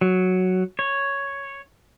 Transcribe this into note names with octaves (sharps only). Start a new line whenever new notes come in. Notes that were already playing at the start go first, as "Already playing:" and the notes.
F#3
C#5